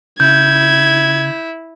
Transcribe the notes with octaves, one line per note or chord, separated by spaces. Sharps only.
C#3 E4 G6 G#6